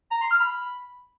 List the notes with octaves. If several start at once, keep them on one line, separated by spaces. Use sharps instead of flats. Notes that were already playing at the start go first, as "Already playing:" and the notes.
A#5
C6
F6
B5